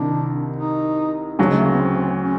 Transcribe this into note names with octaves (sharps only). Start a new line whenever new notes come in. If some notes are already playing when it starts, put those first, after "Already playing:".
Already playing: C2 C3 D#3 D4
D#4
D2 C#3 F#3 D4
G#3
A3
A#3
B3
C4
C#4